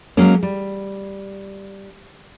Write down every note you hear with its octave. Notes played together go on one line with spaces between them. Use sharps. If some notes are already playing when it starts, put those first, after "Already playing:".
F#3 G#3 A#3 C#4
G3